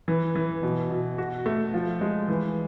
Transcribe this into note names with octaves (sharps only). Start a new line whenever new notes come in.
E3
E3
B2
B2
F#4
A3
F3
G#3
E3